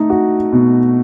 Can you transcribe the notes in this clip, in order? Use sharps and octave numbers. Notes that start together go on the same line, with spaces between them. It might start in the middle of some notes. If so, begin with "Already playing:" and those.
Already playing: A3 D#4
F#4
B2